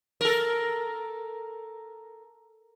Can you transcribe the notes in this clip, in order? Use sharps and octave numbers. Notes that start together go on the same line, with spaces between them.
A4 A#4